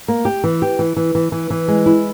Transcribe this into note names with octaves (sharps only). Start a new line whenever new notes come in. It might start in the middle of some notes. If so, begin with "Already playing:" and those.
A#3
G4
E3
G4
E3
E3
E3
E3
E3
G#3
E4